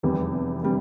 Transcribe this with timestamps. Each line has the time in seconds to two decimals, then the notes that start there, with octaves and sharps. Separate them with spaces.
0.03 F1 E2 C3 G3
0.63 C3 G3